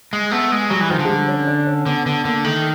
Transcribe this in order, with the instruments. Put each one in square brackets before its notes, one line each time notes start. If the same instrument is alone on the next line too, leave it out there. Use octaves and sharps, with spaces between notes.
[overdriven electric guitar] G#3
[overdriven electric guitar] A3 [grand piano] B3
[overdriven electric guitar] G#3
[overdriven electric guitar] F#3 [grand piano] G3
[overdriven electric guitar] E3
[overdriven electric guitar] D#3 [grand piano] F3
[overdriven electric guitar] D3
[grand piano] G#3
G3
C#4
D4
C#4
[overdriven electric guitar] D3 [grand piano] B3
[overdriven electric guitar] D3 [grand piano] B3
[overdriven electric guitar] D3 [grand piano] A#3
[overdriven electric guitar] D#3 [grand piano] A3